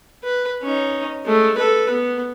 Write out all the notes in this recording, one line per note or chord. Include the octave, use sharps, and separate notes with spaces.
B4
C#4 D#4
G#3 A3
A4 B4
B3